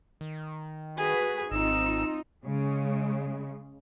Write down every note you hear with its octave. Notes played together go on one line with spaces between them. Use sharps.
D#3
F#4 G#4 B4
G#1 C4 D#4 F4 E6
C#3 G#3